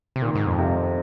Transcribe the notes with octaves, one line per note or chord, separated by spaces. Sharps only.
C3
A#2 D#3
G#2
F2
C3